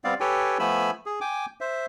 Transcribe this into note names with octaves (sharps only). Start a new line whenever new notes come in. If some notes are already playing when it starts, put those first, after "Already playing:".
G3 B3 C4 D5 F5
G4 A4 B4 C#5 G5 G#5
F3 A3 B3 G#5 B5 E6
G#4
G5 G#5 D6
C5 E5